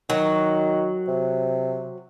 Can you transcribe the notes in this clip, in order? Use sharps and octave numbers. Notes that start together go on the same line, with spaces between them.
D#3 F#3
C3